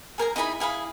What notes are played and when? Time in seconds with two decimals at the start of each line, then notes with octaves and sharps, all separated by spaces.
0.18 G#4 A#4 G#5 A#5
0.36 D#4 E4 G#4 B5
0.60 E4 G#4 F5 B5